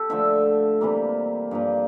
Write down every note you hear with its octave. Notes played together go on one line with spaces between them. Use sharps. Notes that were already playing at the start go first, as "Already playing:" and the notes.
Already playing: G4 A4
D3 F3 A3 E5
C3 E3 G3 A#3
G2 F3 A#3